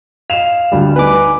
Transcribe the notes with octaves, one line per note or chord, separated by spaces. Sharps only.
D#5 F5 E7 F7
D2 G3
B3 D#4 B4 G#5 D6